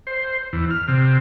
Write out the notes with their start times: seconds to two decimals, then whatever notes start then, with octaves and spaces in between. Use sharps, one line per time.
0.07 C5
0.53 E2
0.71 F6
0.88 C3